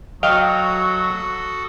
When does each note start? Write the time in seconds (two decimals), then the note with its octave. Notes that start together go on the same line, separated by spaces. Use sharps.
0.23 F#3 F#4 A4 D#5 F5 G5 D#6